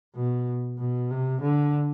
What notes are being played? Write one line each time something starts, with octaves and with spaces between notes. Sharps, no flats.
B2
B2
C3
D3